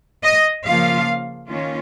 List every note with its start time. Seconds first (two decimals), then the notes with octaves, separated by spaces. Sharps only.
0.24 D#5
0.66 C#3 F3 A#3 F4 F5
1.49 D#3 A#3 C#4 F4